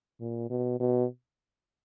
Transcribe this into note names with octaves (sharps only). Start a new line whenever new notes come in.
A#2
B2
B2